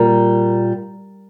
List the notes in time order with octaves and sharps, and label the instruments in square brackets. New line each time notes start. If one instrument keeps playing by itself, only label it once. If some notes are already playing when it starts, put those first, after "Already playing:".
Already playing: [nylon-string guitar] A#2 G3 A#4